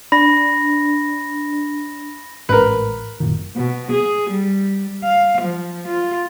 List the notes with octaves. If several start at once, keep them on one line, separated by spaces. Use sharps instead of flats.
D4 B5 A#6
A1 G#2 C#4 A#4 B4
F#1 A#2 D#3
B2
G#4
G3
F5
F3
F4